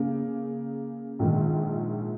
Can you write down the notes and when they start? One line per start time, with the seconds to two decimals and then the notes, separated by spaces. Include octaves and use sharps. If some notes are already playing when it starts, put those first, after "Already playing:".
Already playing: C#3 A#3
1.19 A#1 G#2 D#3